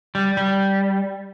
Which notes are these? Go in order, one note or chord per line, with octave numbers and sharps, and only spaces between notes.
G3
G3